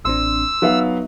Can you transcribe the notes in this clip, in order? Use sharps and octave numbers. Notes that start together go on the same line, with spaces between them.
A1 C4 D4 C6 E6
F#3 B3 D#4 E5 F5